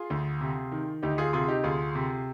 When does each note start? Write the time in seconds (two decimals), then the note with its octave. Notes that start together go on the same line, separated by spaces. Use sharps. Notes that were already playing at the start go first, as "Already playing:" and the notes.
Already playing: F4 G#4
0.10 D2
0.41 C3
0.72 D#3
1.02 D2 D#4 G4
1.18 F4 G#4
1.33 C3 F4 G#4
1.48 D#4 G4
1.64 D2 F4 G#4
1.95 C3